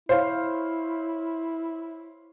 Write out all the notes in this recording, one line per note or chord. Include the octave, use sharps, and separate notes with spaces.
E4 C5 C#5 F5